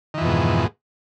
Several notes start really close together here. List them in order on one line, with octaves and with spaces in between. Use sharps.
D#3 E3 F2 B2 G#2